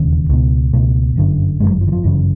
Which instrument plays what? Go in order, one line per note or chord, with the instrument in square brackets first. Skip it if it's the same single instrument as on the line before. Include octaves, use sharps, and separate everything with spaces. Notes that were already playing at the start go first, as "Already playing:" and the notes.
Already playing: [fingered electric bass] E1 D#2 C#3
C#2 B2
C#2 B2 A3
G1 F#2 D3
G1 F#2 D3 G#3
F#3
F3
E3
F3
G1 F#2 C#3 E3